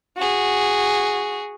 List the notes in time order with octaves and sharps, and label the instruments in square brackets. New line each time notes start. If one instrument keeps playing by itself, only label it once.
[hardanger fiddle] F#4 G#4